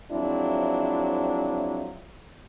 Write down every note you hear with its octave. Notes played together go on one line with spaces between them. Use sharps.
F3 F#3 G#3 C4 D4 E4